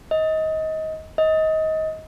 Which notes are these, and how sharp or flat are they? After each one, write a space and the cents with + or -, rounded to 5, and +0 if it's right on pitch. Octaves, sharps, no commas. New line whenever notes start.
D#5 +25
D#5 +25